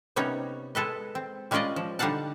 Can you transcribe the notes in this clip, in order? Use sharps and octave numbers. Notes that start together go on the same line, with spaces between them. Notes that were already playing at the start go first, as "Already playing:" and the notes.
C3 G3 B3 C#4 D#4 C#5
G#3 A4 B4 D#5
C4
G3 G#3 C#4 F4 D5 D#5
F3
D3 G3 D#4 F5 F#5 A5